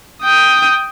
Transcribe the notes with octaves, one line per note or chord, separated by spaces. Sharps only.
G5 D#6